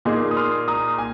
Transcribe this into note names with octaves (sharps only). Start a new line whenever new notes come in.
A#2 A#3 D#4 G#4 G#5 C6
D#6
C6 F6
A#5 D#6
G#5